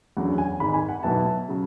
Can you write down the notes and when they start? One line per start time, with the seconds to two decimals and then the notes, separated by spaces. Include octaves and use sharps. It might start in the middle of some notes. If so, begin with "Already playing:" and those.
0.17 E2 D3 F#3 C#4 F#5
0.38 G#5
0.60 G#1 G#2 G#3 B5
0.74 G#5
0.89 F#5
1.03 B1 B2 F#3 B3 E4 A5
1.48 C#3 F#3